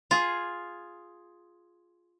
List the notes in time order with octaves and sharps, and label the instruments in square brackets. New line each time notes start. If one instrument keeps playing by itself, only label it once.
[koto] F4 G#4